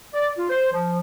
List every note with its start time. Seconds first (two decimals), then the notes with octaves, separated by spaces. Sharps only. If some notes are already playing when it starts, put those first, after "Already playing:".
0.14 D5
0.38 F4
0.50 C5
0.73 F3